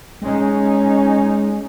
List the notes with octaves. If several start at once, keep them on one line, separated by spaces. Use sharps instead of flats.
G#3 C#4 D#4